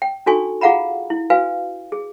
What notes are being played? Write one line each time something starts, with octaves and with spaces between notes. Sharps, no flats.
G5
D4 D#4 F#4 A4 G#5 C#6
F4 G#4 F5 F#5 A#5 B5
E4
F#4 B4 F5 G#5
G#4